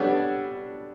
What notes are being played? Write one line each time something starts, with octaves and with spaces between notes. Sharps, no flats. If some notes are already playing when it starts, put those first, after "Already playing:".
Already playing: G3 B3 D4 A4 C#5